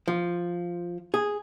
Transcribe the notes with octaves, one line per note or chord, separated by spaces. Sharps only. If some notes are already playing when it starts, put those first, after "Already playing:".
F3
G#4